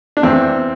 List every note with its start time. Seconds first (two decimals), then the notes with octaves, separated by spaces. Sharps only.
0.17 D4
0.23 E2 C4